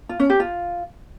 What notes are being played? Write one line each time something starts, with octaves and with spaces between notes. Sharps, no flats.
F4
C#4
G4
F4